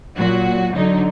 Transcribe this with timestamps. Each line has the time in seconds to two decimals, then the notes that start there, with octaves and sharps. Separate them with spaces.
0.17 A#2 F#3 F#4
0.74 D3 F#3 D#4